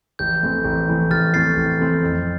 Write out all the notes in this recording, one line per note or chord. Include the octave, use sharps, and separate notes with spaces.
A1 G6
A2 E3 A3 C4
A1
A2 E3 A3 C4
A1 F6 A6
A2 E3 A3 C4 A6 C7
A1
A2 E3 A3 C4
F2